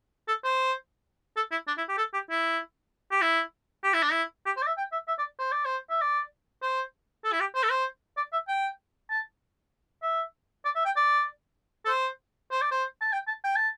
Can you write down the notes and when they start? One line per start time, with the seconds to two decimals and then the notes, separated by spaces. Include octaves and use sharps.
0.28 A4
0.44 C5
1.37 A4
1.52 E4
1.68 D4
1.78 E4
1.89 G4
1.98 A4
2.14 G4
2.30 E4
3.12 G4
3.22 E4
3.84 G4
3.94 E4
4.03 D4
4.12 E4
4.46 G4
4.57 C5
4.62 D5
4.67 E5
4.78 G5
4.92 E5
5.08 E5
5.19 D5
5.39 C5
5.52 D5
5.65 C5
5.90 E5
6.01 D5
6.63 C5
7.25 A4
7.33 E4
7.40 G4
7.55 C5
7.63 A4
7.71 C5
8.17 D5
8.33 E5
8.48 G5
9.10 A5
10.03 E5
10.65 D5
10.76 E5
10.85 G5
10.97 D5
11.85 A4
11.88 C5
12.51 C5
12.62 D5
12.71 C5
13.02 A5
13.13 G5
13.28 A5
13.44 G5
13.56 A5